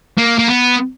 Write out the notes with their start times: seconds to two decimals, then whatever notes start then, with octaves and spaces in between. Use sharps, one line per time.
0.18 A#3
0.38 A#3
0.48 B3